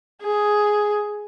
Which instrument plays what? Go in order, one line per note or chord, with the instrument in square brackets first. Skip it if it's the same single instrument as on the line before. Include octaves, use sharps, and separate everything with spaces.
[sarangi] G#4